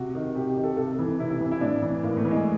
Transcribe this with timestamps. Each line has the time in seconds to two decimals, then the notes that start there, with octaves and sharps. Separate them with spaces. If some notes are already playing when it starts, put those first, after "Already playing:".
Already playing: C3 F#4
0.15 D#3
0.35 C3 G4
0.50 G4
0.57 D#3
0.64 A4
0.77 C3 A4
0.99 E3
1.19 C3 E4
1.30 E4
1.41 E3
1.51 E4
1.61 A2 D4
1.82 E3
2.03 A2 A#3
2.17 A3
2.25 E3
2.31 G#3